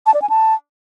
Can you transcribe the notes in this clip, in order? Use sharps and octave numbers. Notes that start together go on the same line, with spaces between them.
A5
D5
G#5
A5